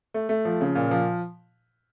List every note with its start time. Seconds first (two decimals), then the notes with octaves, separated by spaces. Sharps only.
0.14 A3
0.29 A3
0.45 F3
0.61 C#3
0.75 A#2
0.91 F3